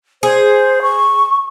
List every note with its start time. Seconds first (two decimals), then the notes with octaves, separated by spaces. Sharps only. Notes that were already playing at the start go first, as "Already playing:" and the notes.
0.23 G#4 C5
0.82 C#6